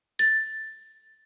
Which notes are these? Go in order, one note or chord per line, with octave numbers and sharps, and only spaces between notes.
A6